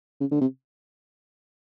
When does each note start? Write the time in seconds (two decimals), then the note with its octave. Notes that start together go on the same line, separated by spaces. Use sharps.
0.21 C#3
0.31 D3
0.41 C3